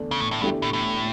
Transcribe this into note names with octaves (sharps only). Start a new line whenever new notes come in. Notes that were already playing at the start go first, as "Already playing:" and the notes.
Already playing: E2 D3 A3 D4
C#3
A2
A2
E2 G2 D3 A3 E4 G4
A2
A2